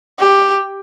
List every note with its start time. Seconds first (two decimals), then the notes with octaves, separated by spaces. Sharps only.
0.20 G4